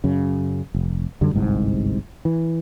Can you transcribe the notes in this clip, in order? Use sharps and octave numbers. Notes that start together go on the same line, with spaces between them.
F#2 C#3
F1
F#2 D3 F#3 G3
G1 C2 G#2 C3
E3